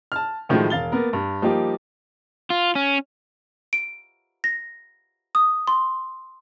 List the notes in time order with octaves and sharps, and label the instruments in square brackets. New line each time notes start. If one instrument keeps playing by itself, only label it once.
[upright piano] A5 F6
A2 D#3 F3 F#3 G#3
E1 F5 A6 G7
A#3 B3 A#4
G2
F3 G3 A#3 D#4 G4
[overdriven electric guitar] F4
C#4
[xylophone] D7
A#6
D#6
C6